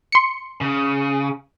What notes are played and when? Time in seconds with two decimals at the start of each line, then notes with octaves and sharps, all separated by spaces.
0.12 C6 C#7
0.61 C#3